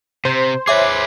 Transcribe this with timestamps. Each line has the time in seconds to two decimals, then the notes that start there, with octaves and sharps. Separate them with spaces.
0.25 C3 C5
0.67 G#4 B4 C#5 E5 D6